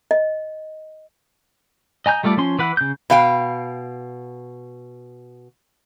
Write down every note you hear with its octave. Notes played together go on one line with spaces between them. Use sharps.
D#5
D#5 G#5 A#5 G6
G3 A3 F4 A4 D5
F3 C#4 C6
E3 B4 F#5
C#3 G6
B2 F5 G5